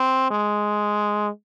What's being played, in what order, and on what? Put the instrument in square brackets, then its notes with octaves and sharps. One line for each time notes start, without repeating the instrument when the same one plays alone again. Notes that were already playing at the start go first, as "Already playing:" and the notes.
Already playing: [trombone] C4
G#3